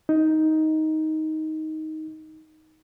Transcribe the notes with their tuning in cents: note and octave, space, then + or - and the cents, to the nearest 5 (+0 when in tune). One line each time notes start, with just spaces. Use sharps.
D#4 +10